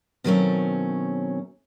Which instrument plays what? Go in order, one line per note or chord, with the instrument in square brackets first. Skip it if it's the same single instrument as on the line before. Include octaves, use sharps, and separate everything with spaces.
[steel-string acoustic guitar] B2 D#3 F#3 A3 C4 C#4